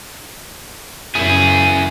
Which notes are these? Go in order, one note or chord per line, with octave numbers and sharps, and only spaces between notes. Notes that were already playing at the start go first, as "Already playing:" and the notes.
F#2 C#3 E4 G#4